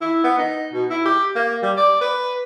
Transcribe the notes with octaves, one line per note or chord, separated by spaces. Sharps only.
E4
B3
D#4
B2
E4
G4
A#3
G3
D5
B4